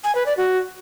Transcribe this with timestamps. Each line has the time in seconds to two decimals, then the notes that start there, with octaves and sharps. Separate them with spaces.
0.04 G#5
0.15 B4
0.26 D5
0.37 F#4